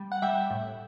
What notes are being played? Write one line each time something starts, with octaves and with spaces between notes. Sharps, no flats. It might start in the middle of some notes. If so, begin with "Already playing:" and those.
Already playing: G3
F#5
G3 E5 G5
A2